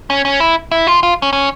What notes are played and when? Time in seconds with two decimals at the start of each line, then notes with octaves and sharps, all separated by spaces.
0.10 C#4
0.25 C#4
0.40 E4
0.72 E4
0.87 F4
1.03 F4
1.22 C#4
1.33 C#4